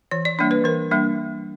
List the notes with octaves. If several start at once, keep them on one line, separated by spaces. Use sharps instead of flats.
E3 C#5
D5
G3 A#3 D4
B4
E3 A#4
G3 A#3 D4